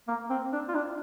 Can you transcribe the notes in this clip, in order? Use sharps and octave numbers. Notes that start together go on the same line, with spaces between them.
A#3
C4
D4
F4
D4